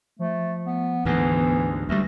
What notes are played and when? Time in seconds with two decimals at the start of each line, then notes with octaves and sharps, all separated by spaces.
0.19 F3 A3
0.66 B3
1.05 D2 G#2 E3 B3
1.89 D2 G3 A3 A#6